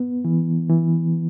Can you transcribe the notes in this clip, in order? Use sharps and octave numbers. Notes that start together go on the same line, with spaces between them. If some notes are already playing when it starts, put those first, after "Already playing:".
Already playing: B3
E3
E3